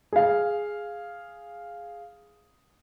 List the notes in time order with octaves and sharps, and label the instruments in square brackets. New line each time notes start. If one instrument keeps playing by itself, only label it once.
[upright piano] G#4 F5